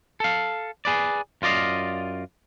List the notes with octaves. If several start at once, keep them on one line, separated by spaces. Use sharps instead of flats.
A4 F5
G#4 B4 D5
F#2 F4 D5 D#5 F5